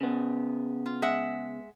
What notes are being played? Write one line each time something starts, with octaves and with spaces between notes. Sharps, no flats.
C#3 B3
F4
G#3 E5 F#5